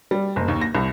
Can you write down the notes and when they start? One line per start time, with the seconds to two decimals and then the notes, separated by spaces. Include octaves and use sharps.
0.11 G3
0.36 F#1
0.48 D#2
0.61 A#6
0.75 C2